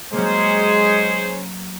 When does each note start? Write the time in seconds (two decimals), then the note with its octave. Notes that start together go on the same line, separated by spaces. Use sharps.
0.13 F#3 G#3 A#3 C#4 G#4 C5